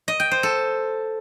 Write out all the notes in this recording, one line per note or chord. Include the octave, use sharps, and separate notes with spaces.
D#5
G5
C5
A4